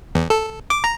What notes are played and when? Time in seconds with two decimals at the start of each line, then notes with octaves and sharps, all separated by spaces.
0.15 E2
0.30 A4
0.70 D6
0.84 A#5